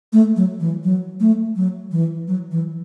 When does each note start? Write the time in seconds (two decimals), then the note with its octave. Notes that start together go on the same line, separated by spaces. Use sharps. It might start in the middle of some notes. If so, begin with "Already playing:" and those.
0.13 A3
0.36 F#3
0.60 E3
0.84 F#3
1.20 A3
1.56 F#3
1.91 E3
2.28 F#3
2.51 E3